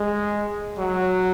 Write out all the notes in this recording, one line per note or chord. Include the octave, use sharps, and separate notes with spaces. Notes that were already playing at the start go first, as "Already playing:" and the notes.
Already playing: G#3
F#3